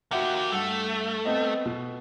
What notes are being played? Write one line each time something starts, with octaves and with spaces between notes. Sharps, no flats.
A#3 F#4 G4 E5 F#5
G2 A3 F#5 F7
B3 C4 D#5
B2